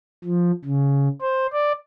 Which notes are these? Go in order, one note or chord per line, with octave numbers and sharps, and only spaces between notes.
F3
C#3
C5
D5